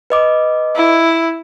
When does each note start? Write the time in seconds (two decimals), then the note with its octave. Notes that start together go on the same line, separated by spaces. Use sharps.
0.10 B4 D#5 D6
0.75 E4